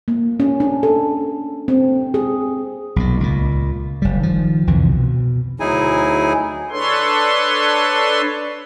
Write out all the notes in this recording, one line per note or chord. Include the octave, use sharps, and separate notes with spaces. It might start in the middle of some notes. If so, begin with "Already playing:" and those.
A#3
C#4
D4
A4
C4
G#4
B1 A#2
C#2 A#2
F#1 G3
D#3 F3
C2 F2 D3 E3
B2
D2 F#3 D#4 E4 G#4 G#5
D4 A4 B4 C#5 C6